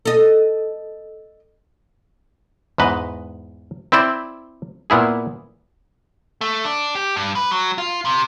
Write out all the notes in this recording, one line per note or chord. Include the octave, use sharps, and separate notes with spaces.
A4 D#5
E2 G#2 B4 D#5
C4 E4 C5 D5
A#2 B3 E4 G#4
A3
D4
G4
G2
B4
F#3
F4
C3